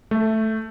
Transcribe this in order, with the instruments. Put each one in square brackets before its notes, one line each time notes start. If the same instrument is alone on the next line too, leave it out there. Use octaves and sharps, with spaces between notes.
[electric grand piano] A3